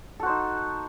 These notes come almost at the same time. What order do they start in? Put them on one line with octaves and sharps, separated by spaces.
A4 F#4 C5 D#4